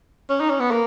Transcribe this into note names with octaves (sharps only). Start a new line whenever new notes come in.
C#4
D#4
C#4
B3
A#3